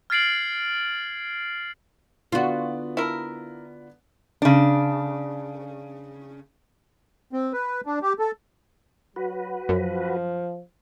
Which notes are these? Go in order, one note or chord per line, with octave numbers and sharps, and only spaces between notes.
F6 G#6 A6 C7 D7 F#7
D3 B3 F4 F#4 D5
E4 A#4
C#3 D4
C4
B4
D4
G4
A4
F#3 F#4 B4
F#2 F3